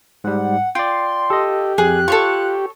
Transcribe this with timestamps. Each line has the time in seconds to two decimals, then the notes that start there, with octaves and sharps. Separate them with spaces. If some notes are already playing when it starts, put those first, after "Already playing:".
0.24 G#2 G3 F#5
0.75 F4 D5 G5 C6
1.30 G4 A4 D#5
1.78 F2 G#4 F#6
2.08 F4 A4 C#5 C#6